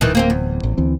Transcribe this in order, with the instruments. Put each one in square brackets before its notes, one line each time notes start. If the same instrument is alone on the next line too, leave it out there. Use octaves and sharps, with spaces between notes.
[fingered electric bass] D1 [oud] D#3 E3
[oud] A#3 C4 G4
E2
[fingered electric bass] A1
D2 E3 C4